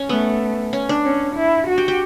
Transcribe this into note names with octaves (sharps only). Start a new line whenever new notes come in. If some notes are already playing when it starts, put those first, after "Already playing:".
Already playing: C#4
A3 B3
C#4
D4
C#4
E4
F#4
G4
G4